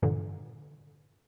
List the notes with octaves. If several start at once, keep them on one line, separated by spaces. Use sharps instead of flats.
G2 A#2 D3 E3